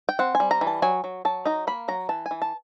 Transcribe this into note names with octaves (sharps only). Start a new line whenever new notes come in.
G5
C4 F#5
G#5
G3
A#5
E3
A5
F#3 G#5
F#3
F#3 A5
D#4 A#5
A#3 B5
F#3 A#5
E3 A5
G#5
E3
A5